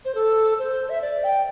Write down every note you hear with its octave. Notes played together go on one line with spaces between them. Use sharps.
C5
A4
C5
E5
D5
G5